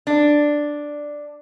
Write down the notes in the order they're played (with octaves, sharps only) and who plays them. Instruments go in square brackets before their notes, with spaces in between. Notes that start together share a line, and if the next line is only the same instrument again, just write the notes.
[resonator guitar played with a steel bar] D4